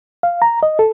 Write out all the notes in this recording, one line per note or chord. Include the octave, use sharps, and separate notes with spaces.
F5
A#5
D#5
A4